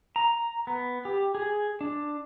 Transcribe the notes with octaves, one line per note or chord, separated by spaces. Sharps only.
A#5
B3
G4
G#4
D4